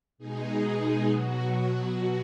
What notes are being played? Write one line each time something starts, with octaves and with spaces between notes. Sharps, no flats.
B2 G#3 D#4 G#4
B2 F#3 F#4